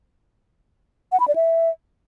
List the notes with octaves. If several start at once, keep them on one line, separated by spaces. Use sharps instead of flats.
F#5
B5
D5
E5